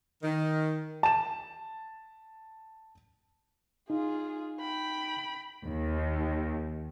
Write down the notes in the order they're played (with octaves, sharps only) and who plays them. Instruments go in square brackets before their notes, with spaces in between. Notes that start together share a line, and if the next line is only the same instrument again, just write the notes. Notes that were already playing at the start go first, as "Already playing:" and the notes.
[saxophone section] D#3
[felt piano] A5 E7
[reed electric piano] D#4 [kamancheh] F4 G#4
[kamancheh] G5 B5
[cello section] D#2